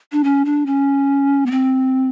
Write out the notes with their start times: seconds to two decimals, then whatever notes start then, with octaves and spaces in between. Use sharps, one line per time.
0.12 D4
0.24 C#4
0.45 D4
0.66 C#4
1.46 B3
1.51 C4